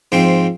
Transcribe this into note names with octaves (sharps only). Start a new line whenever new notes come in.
G#2 F3 C4